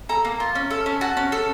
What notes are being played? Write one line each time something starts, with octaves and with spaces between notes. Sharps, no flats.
A4 A#5
A#3
F4
C#4
A4
C#4
F#4 A5
C#4
A4